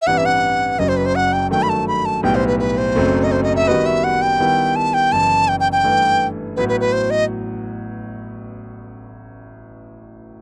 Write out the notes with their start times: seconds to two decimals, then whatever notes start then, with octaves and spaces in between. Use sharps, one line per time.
0.02 E5
0.06 A1 G2 E3 G3 C4 F#5
0.18 E5
0.25 F#5
0.79 F#1 F#2 F#3 D#5
0.88 C5
0.97 B4
1.06 C5
1.15 F#5
1.33 G5
1.51 G2 D#3 F#3 A3 G5
1.63 B5
1.69 A5
1.88 B5
2.05 A5
2.23 B1 A2 G3 B3 G5
2.35 C5
2.47 B4
2.59 B4
2.78 C5
2.96 F#1 F#2 F#3 A3 C4
3.24 D#5
3.32 C5
3.43 D#5
3.56 E5
3.67 D#3 G3 B3 F#4 B4 D#5
3.86 E5
4.04 F#5
4.22 G5
4.40 D#3 G3 B3 E4
4.76 A5
4.94 G5
5.12 F#1 F#2 E3 A5
5.48 G5
5.60 G5
5.72 G5
5.84 G2 E3 A3
6.56 A1 A2 F#3 B3 F#4 B4
6.69 B4
6.80 B4
6.92 C5
7.10 D#5